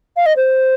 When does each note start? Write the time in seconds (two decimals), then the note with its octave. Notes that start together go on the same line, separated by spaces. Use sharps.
0.16 F5
0.26 D#5
0.36 C5